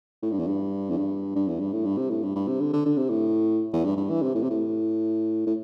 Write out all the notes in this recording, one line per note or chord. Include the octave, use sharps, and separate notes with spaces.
A2
G2
E2
G2
E2
G2
G2
E2
G2
A2
G2
C3
A2
G2
G2
C3
D3
D3
D3
C3
A2
E2
G2
G2
E3
C3
A2
C3
A2
A2